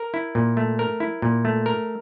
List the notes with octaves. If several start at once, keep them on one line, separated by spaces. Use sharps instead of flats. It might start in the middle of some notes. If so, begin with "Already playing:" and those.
Already playing: A#4
E4
A#2
A3
A#4
E4
A#2
A3
A#4